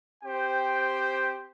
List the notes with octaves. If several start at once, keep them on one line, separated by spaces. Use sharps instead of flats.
C4 G4 C5 G5